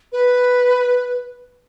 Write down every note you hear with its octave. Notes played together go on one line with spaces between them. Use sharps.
B4